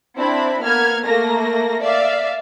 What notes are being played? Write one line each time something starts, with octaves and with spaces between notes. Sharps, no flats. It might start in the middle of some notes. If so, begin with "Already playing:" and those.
C4 D4 E4 B5
A#3 B3 F6 G#6
A3 A#3 A#4 A#6
D5 E5 F5